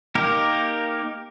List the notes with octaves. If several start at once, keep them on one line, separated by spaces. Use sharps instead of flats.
A#3 D#4 G4 A#4